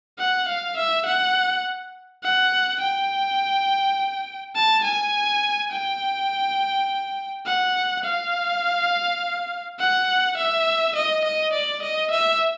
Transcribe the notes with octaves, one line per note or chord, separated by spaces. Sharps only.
F#5
F5
E5
F#5
F#5
G5
A5
G#5
G5
F#5
F5
F#5
E5
D#5
D#5
D5
D#5
E5